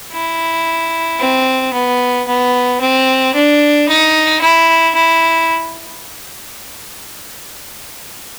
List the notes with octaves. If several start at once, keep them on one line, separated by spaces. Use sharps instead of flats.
E4
C4
B3
B3
C4
D4
D#4
E4
E4